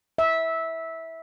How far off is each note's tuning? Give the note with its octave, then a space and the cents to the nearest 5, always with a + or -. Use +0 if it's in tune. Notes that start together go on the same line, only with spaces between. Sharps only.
E5 -15